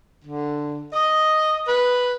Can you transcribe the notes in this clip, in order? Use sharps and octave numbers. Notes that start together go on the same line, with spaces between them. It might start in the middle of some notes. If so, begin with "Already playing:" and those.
D3
D#5
B4